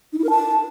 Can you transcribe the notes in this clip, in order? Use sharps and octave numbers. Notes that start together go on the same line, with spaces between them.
D#4
E4
A#4
A5